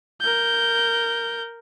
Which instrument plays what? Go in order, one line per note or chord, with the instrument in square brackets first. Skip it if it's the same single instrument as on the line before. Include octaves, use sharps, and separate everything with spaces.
[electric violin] A#4 G6